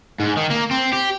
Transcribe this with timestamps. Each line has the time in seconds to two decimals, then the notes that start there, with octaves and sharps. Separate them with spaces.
0.20 G#2
0.37 D#3
0.50 A#3
0.71 C4
0.93 G4